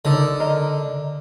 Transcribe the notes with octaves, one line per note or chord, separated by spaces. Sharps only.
D3 D#4 A#4 D5
A#4 D#5 A#5